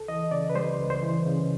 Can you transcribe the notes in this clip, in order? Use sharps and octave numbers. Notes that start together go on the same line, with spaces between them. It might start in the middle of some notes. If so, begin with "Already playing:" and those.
Already playing: C#2 A4
E3 D#5
C#3 D5
B4
G3 C5
C#2
C5
E3
C#3